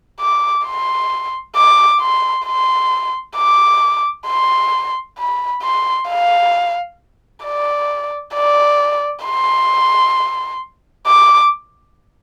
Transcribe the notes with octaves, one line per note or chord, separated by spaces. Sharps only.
D6
C6
D6
C6
C6
D6
C6
B5
C6
F5
D5
D5
C6
D6